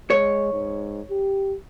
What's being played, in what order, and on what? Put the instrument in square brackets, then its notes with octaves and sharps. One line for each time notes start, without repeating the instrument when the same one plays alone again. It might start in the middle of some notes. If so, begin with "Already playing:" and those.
[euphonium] G#3 [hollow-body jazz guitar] C#5
[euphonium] G#2
G4